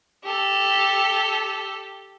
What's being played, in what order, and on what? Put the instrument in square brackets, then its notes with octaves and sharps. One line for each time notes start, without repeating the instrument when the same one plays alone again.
[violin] G4 A4